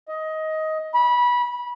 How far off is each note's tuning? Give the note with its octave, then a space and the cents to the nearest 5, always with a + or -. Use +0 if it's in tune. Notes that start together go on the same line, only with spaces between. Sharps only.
D#5 +15
B5 -20